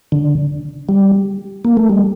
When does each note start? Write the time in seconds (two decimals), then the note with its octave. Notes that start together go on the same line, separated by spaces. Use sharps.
0.12 D3
0.89 G3
1.65 A#3
1.77 A3
1.89 G3